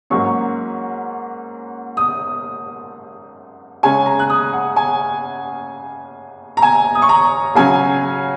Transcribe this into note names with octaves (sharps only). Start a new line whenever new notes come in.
G#2 F#3 A#3 C#4 C#6
D#6
C#3 G#3 C#4 G#5
A#5
F#6
D#6
F#5
G#5
A#5
G#5
D#6
C#6
A#5
C#3 F#3 C#4 G#5